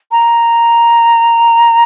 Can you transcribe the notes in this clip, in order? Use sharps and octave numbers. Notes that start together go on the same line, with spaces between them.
A#5